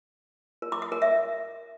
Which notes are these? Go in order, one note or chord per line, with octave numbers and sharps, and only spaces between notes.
A#4
D6
D#6
A#4
E5